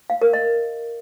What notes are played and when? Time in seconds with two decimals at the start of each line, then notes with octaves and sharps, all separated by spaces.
0.10 F5
0.22 A#4
0.33 D#5